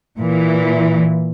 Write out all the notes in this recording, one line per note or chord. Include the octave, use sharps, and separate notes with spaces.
A#2 E3